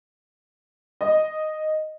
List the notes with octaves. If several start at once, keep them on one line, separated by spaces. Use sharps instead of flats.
D#5